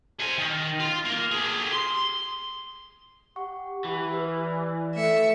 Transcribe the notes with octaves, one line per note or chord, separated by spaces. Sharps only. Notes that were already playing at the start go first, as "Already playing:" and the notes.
C5 G#5
D#3
F4
A#3
G4 G#4
C6
G4 F#5 C#6
E3
B4
D5
A3 E5 C#7